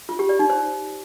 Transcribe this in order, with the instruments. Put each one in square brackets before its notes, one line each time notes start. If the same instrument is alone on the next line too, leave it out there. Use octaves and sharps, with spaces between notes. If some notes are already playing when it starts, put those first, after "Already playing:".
[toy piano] F4
G4
D5
D#4
C5